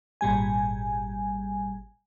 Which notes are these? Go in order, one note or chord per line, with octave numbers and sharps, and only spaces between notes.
G#1 A#2 G3 G#5